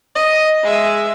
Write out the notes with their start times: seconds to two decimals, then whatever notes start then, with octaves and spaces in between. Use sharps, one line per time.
0.15 D#5
0.63 G#3 E5